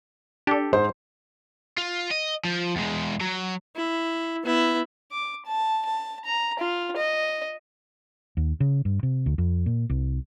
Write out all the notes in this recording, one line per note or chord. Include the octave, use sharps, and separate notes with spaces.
D4 G4 A4
G#2 C5
F4
D#5
F3
E2 G#3
F#3
E4
B3 E4
D6
A5
A5
A#5
F4
D#5
D#2
C#3
G2
C3
D2
F2
A#2
C2